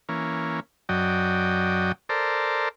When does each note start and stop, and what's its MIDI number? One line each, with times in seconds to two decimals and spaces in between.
0.09 0.60 52
0.09 0.60 58
0.09 0.60 61
0.89 1.92 42
0.89 1.92 54
0.89 1.92 74
0.89 1.92 75
0.89 1.92 79
2.09 2.69 69
2.09 2.69 70
2.09 2.69 72
2.09 2.69 74